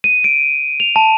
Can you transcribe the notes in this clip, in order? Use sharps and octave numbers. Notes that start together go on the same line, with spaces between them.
D#7
D7
F7
A5